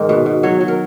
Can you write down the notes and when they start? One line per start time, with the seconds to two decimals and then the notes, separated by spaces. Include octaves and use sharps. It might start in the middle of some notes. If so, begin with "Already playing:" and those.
Already playing: G#2 D#3
0.09 B2 B4
0.26 B2
0.43 F#3 C#5
0.61 F#3
0.68 A#4